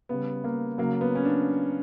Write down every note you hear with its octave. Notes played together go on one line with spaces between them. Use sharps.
C#3 G3 B3
A#3
C#3 F#3 A#3
B3
C#4
D4